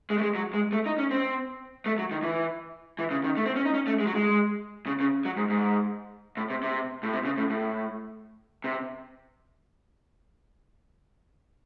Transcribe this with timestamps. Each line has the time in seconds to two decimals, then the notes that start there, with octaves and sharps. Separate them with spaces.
0.10 G#3
0.18 A3
0.22 G#3
0.35 F#3
0.54 G#3
0.73 A3
0.86 D#4
0.98 C#4
1.11 C4
1.86 A3
1.98 F#3
2.11 D#3
2.23 E3
2.99 E3
3.11 C#3
3.24 D#3
3.37 A3
3.46 C4
3.56 C#4
3.65 D#4
3.74 C#4
3.87 A3
4.00 G#3
4.06 F#3
4.15 G#3
4.86 C#3
5.00 C#3
5.25 F#3
5.37 G#2
5.50 G#2
6.37 A2
6.50 C3
6.63 C3
7.03 A2
7.13 C3
7.25 C#3
7.38 A2
7.50 A2
8.64 C3